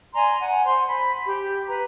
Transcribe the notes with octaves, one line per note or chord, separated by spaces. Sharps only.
D5 G#5 A#5 C6
F#5 G#5
C5 C6
B5
G4
B4 A#5